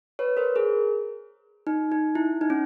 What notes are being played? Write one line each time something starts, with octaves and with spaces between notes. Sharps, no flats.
B4 C#5
A#4 C5
G#4 A#4
D#4
D#4
E4
D#4
C#4